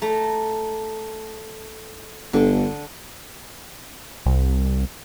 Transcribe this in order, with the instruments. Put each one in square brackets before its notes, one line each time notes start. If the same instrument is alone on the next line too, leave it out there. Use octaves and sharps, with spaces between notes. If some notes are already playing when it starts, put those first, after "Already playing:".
[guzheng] A3 A#5
[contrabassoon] G1 [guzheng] D3
[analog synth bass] C2